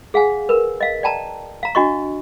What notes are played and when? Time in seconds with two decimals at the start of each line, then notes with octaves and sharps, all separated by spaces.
0.14 G#4 F5 F#5 G#5
0.49 A#4 B4
0.81 D#5 F5
1.03 D5 G5 A5 A#5
1.63 F5 A#5
1.75 D4 F#4 D#5 C#6